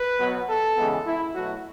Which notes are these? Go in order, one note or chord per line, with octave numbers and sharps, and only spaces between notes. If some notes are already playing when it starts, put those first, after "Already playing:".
Already playing: B4
B2 F#3 B3
A4
C#3 E3 G#3 B3
E4
B2 F#3 A3 F#4